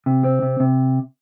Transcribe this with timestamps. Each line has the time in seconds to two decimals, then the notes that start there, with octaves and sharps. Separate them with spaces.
0.06 C3
0.24 C4
0.42 C3
0.60 C3